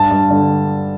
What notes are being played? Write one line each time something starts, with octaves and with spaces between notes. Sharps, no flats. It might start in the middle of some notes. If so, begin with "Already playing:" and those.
Already playing: G2 A5
G2
D3